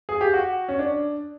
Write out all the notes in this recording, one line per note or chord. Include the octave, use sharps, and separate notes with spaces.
G#4
G4
F#4
C#4
D4